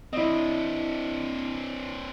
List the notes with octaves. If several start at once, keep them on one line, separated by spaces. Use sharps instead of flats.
C4 D4 E4 D#5